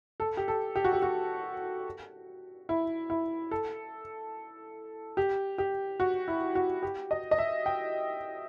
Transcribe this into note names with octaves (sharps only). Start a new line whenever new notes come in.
A4
G4
A4
G4
F#4
G4
F#4
E4
E4
A4
G4
G4
F#4
E4
F#4
G4
D#5
D#5
E5
G5